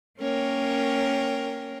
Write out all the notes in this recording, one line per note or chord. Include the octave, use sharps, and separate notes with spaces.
A#3 C#4 A#4 C#5 G5